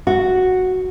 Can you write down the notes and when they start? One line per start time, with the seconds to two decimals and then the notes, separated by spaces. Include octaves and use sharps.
0.07 F#4